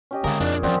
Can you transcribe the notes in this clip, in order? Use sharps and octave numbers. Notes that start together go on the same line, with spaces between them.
C#4 G4 D#5
D3 G#3 G#4 A#4 F5 D6
F2 A#2 D4 D#4
E2 F3 C4 C#4 D5 F#5